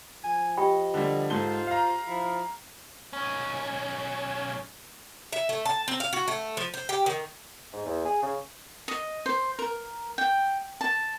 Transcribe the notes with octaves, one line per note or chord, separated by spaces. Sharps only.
F3 G#5
G4 D#5 G5 B5
D3 G3
G#2 F4 A4 C5 G7
F5 A#5
F3 E4
B1 C#4
E5
A3
A5
C4
F5
F#4
A3
F3
C5
G4
D#3
G#2
E2
G#4
C#3
D#5
C5
A#4
G5
A5